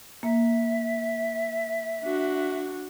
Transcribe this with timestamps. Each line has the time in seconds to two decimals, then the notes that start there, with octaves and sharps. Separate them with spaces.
0.23 A#3 E5
2.04 D4 F#4